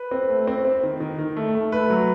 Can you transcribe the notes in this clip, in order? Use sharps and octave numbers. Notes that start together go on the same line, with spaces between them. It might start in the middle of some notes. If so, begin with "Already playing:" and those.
Already playing: B4
C4
A3
C4
C4
D#3
D#3
D#3
A3
A3
A3 B4
F#3